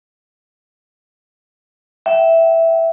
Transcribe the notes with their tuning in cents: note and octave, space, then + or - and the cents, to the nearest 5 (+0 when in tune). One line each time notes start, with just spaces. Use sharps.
E5 +0 G5 -35